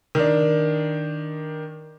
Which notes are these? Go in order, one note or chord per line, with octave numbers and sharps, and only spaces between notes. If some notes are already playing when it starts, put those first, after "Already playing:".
D#3 D4